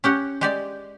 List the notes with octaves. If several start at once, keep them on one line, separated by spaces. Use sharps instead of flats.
C#4 G4 F#5
G#3 G4 D5